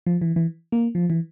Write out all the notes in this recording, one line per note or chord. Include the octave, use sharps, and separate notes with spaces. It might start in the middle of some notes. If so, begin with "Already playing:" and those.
F3
E3
E3
A#3
F3
E3